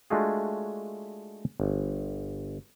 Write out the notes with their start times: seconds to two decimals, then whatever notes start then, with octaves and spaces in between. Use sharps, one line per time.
0.10 G#3 A3 D4 F4 F#4 G#4
1.60 G1